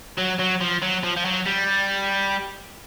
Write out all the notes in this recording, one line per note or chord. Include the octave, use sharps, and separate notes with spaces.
F#3
F#3
F3
F#3
F3
F3
F#3
G3